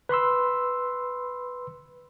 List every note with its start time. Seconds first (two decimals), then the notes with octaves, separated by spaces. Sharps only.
0.09 B4 B5 C6 E6